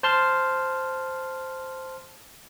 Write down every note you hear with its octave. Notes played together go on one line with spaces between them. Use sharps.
C5 A5 C6 F6